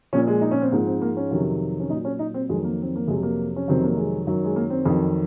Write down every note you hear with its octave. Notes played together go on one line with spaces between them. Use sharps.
A#2 F3 C#4
G#3
D#4
C#4
C4
G#2 F3 A#3
C4
A#3
C#4
F2 C3 D#3 F#3
C#4
A#2 F#3 D#4
C#4
D#4
C4
F2 D#3 F#3 G#3
A#3
C4
A#3
F2 C3 F#3 G#3
A#3
C#4
F2 C3 D#3 F#3 C4
A#3
G#3
F#2 D#3 F#3
G#3
A#3
C4
F2 D#3 F#3